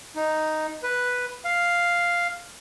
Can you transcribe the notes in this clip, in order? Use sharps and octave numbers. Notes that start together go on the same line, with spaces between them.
D#4
B4
F5